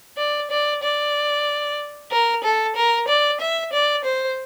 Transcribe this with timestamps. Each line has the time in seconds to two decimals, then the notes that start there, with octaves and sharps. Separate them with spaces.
0.17 D5
0.51 D5
0.83 D5
2.11 A#4
2.43 A4
2.76 A#4
3.08 D5
3.41 E5
3.73 D5
4.04 C5